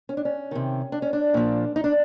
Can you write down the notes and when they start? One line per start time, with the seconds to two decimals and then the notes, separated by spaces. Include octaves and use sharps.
0.09 C#4
0.17 D4
0.25 C#4
0.51 C3 D#3
0.92 D4
1.02 C#4
1.13 D4
1.34 A#2 F3
1.76 D#4
1.84 D4